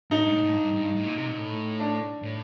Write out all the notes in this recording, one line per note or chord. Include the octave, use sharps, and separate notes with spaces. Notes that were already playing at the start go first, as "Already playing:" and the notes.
A2 D#4
G2
A2
A2
G2
G2
A2
A#2
C3
A#2
A2
D4
A2